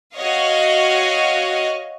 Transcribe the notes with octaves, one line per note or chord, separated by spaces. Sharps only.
F#4 C#5 D#5 F5